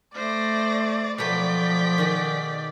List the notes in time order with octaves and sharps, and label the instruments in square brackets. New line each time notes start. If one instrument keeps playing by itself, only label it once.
[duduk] A3 [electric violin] C5 A#6 [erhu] D5
[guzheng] B2 F#3 A3 [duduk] F3 [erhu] D5 [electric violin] G5 B6
[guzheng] D#3 F#4 G#4